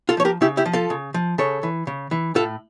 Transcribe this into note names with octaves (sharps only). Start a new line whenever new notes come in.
F4 A4
F3 C#5
G4 A#4
C#3 E4 G4
E4 G4
F3
F4 A4
C#3
F3
C#3 A4 C#5
E3
C#3
E3
A2 F4 A4